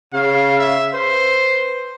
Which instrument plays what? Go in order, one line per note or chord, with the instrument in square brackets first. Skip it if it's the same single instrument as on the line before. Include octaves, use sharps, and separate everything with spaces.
[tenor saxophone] C#3 [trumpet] F5
[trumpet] E5
[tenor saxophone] B4 [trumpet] C5